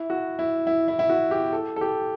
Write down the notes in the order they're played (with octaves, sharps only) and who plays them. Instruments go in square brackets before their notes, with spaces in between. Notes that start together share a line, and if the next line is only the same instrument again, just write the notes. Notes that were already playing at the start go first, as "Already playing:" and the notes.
Already playing: [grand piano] E4
F#4
E4
E4
E4
E4
F#4
G4
A4
A4
G4